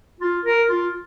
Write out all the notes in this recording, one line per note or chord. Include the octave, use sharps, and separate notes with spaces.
F4
A#4
F4